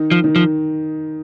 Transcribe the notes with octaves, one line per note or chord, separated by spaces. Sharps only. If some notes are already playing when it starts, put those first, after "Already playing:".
Already playing: D#3 D#4
F3
D#3 D#4
F3